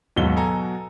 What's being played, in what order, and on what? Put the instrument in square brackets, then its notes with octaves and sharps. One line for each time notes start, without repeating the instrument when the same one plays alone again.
[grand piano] D#2 G#2 G7 [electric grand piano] B2 F#3
[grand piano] A4 G#5 A#5